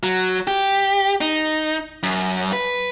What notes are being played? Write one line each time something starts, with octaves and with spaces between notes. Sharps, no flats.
F#3
G4
D#4
F#2
B4